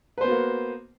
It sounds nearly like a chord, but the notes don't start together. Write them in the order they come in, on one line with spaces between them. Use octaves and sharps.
B4 C5 B3 F#4 A#3